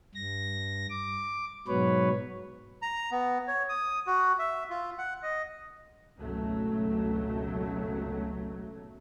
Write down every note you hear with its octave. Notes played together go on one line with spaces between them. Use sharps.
G2 A#6
D6
G#2 B2 F#3 B4 C#5
A#5
B3
C#5
D#6
F#4
E5
F4
F#5
D#5
G#1 C#2 B2 F#3 A3